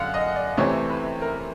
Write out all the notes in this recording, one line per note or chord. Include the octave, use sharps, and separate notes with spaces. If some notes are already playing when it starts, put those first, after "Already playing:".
Already playing: F#2 D3 F5 F#5
D#5
D5
C3 E3 A3 C4 C#5
B4
A#4